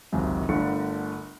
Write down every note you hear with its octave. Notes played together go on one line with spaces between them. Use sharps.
G#1 C#2 F#2 C3
G1 D3 A3 A#4 D5 C#7